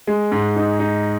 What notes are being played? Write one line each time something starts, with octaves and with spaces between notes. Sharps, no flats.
G#3
G#2
D#4
D#4